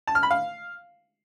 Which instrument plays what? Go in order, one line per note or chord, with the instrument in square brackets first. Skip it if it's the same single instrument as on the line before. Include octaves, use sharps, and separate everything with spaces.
[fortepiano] A5
F6
B5
F5